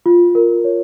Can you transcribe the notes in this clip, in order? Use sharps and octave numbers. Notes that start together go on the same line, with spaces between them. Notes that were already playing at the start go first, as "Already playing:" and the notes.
F4
A#4
C#5